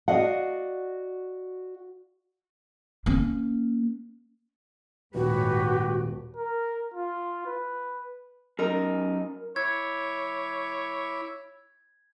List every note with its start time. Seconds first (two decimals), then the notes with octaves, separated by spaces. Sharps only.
0.08 F#4 D5 D#5 F5 F#5
3.06 A#3 C#4
5.15 D#1 G#2 F#4 G4 B4 C#5
6.37 A#4
6.94 F4
7.46 B4
8.59 F#2 D#4 A#4
9.56 E4 C#5 B5 D6 G#6